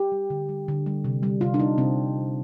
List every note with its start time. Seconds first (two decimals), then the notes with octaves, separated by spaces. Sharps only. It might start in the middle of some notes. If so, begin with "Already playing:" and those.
Already playing: G4
0.12 G3
0.30 D3
0.49 G3
0.68 D3
0.86 G3
1.04 C3
1.23 G3
1.41 C3 F4
1.54 D4
1.59 G3 D#4
1.78 C3 C4